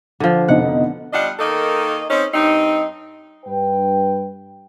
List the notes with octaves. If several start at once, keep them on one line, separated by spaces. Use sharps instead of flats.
D3 F3
F1 B2 D#4 F#5
G3 D4 F4 D#5 F#5
D#3 A#3 D#4 A4 D#5
C4 C#4 D#4
G2 C4 D#4
G2 B4 G5